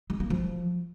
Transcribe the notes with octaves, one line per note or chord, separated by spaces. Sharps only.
G#3
A#3
F3